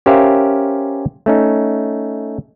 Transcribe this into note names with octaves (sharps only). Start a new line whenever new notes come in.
C#4 G4 A#4 C5 E5 F5
A3 C#4 D#4